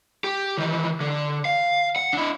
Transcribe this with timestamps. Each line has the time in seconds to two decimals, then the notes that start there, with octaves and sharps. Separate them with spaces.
0.24 G4
0.58 D#3 E3
1.01 D3
1.45 F5
1.96 F#5
2.13 D4 E4